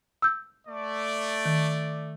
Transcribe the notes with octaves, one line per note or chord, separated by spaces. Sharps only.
E6 G6
A3 D5
D#3